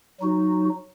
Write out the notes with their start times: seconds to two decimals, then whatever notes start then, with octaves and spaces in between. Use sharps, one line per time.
0.20 F#3 D#4 F#4